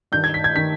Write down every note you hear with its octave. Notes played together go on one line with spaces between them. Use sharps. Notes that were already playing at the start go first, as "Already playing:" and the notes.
G2 D#3 G6
G#6
B6
G#6
D#3 B6